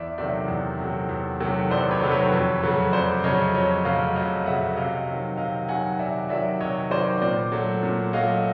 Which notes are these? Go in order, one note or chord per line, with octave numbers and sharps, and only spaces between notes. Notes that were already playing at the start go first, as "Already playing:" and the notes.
Already playing: E2 D5 E5
C3 D#3 F#3 A3 D5 E5
E2
C3 D#3 F#3 A3
E2
C3 D#3 F#3 A3
E2 C5 D5
B4 C#5
C3 D#3 F#3 A3
B4 C#5
F2
C#3 F#3 A3
F2 C5 D5
C#3 F#3 A3 C#5 D#5
F2 C#5 D#5
C#3 F#3 A3 D#5 F5
F2 D#5 F5
C#3 F#3 A3 E5 F#5
C3 D#5 F5
D#3 F#3
C3 D#5 F5
D#3 F#3 F#5 G#5
C3 D5 E5
D#3 F#3 D5 E5
C3 C#5 D#5
D#3 F#3 C5 D5
A#2 C5 D5
F#3 A3
A#2
F#3 A3 D#5 F5